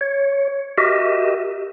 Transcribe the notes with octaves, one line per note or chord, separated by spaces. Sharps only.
C#5
F#4 G4 A#4 D#5 E5